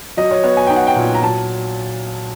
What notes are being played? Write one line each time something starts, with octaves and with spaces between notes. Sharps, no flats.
F#3 D#5
C#5
B3 C#5
G#5
D#4 G5
F#5
G5
A#2
A#5
F#3 A5